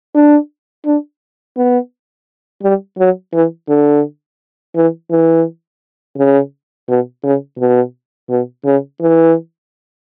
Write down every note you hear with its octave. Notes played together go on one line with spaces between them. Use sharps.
D4
D4
B3
G3
F#3
E3
D3
E3
E3
C#3
B2
C#3
B2
B2
C#3
E3